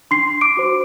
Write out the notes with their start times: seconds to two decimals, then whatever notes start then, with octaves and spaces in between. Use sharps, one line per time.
0.11 D4 C6 C7
0.41 D6 D7
0.57 F#4 C5